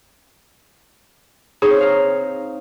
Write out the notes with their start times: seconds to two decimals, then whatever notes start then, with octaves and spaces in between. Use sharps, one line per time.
1.62 C4 D#4 G#4 C#5
1.81 F5 A#5